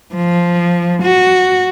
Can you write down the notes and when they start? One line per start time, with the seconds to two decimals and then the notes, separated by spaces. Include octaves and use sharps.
0.15 F3
1.03 F#4